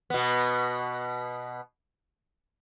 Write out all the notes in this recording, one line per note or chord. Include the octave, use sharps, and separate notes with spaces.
B2 B3